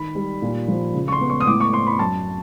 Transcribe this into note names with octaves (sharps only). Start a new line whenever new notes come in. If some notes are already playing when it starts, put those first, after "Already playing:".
Already playing: D#3 B5
G3
A#2
F3
C#3
C#6
C6
B3
C#6
D#6
A2 D6
C#6
C4 C6
B5
F#2 A5